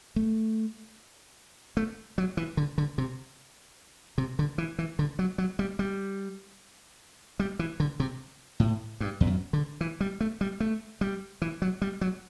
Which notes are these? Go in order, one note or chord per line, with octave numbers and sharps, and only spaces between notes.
A3
A3
F#3
E3
D3
D3
C3
C3
D3
E3
E3
D3
F#3
F#3
G3
G3
G3
E3
D3
C3
A2
G2
E2
F#2
D3
E3
G3
A3
G3
A3
G3
E3
F#3
G3
F#3